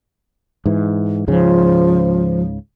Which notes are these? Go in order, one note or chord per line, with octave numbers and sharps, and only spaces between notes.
G#2 E3
C#2 G#2 C#3 F3